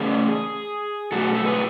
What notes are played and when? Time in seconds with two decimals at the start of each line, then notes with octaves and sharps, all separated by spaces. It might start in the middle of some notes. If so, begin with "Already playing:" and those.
Already playing: C#3 E3 A3 C#4 G#4
1.12 B2 F#3 A3 F#4 A4
1.34 A4
1.45 G#4 B4